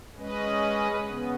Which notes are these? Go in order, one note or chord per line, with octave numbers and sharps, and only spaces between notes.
G#3 C#4 B4 D#5
C#3 B3